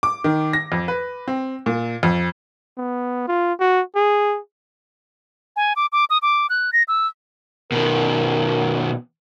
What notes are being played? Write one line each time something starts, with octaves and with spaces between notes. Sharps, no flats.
D6
D#3
A#6
F2
B4
C4
A#2
F2
B3
F4
F#4
G#4
G#5
D6
D6
D#6
D6
F#6
A#6
E6
B2 D#3 A#4